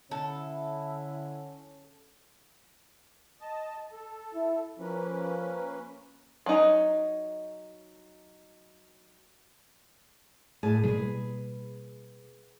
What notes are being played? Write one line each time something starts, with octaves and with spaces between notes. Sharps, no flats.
D3 C#4 E4 A4
D#5 A5
A4
E4
F3 A#3 C#4 B4
F#3 D#4
A2 G#4 A5
B2 G3 A#3 G#4 B4